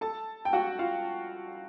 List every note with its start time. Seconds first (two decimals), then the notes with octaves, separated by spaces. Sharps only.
0.01 A4 A5
0.45 G5
0.53 F#4 F#5
0.79 F4 F5